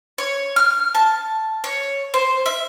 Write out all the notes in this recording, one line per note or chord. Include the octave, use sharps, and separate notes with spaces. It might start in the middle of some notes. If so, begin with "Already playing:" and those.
C#5
F6
A5
C#5
C5
E5